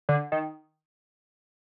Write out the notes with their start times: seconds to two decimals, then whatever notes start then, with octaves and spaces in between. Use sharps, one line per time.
0.09 D3
0.32 D#3